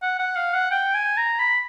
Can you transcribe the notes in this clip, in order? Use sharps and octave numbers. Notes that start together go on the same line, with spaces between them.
F#5
F#5
F5
F#5
G5
G#5
A#5
B5